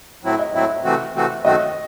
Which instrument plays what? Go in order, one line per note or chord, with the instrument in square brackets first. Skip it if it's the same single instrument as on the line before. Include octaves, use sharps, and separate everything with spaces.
[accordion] A2 F#3 C4 E4
[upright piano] D#5
[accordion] A2 F#3 C4 E4 [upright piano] E5
[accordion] C3 E3 A3 C4 F#4
C3 E3 A3 C4 F#4
[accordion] F#2 D#3 A3 C4 F#4 [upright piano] D#5